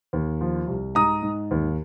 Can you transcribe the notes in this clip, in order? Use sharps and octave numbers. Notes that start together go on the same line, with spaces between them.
D#2
F3
C2
G#2 A#5 D#6
G#2
D#2